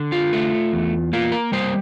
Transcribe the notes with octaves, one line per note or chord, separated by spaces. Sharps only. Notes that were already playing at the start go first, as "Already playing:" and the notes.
Already playing: D3
F4
A3
E2
A#3 F4
A#4
G3 C5